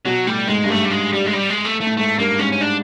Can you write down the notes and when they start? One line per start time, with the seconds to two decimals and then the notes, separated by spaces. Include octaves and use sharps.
0.05 B2 F#3
0.27 A2 G3
0.48 G#2 G#3
0.64 G2
0.70 G#2 A3
0.85 G3
0.91 G#3
1.13 G3
1.26 G#3
1.33 G3
1.49 G#3
1.65 A3
1.81 A3
1.87 A2
1.97 G#2 A3
2.18 G2 A#3
2.39 G#2 C#4
2.52 C#4
2.61 D4